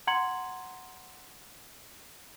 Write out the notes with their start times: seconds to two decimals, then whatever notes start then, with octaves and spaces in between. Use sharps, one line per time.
0.07 F#5 A#5 C6 G#6 C#7 F#7